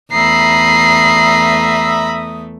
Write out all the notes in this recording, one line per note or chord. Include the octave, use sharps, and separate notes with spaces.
E2 A3 E5 A#5 B5 D#6 C7